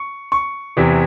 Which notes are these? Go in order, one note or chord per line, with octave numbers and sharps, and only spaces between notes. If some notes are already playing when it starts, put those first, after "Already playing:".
Already playing: C#6
C#6
E2 C3 E3